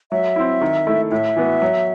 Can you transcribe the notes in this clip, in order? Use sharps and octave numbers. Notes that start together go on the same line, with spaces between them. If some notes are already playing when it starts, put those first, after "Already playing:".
F#3 E5
C4 E4
D#3
A3 E4
A2 E5
E3 B3 F#4
F#3